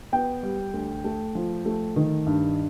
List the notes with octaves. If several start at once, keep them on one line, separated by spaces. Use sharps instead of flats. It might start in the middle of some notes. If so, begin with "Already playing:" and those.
B3 G5
G3
D2
A3
F3
A3
D#3
G2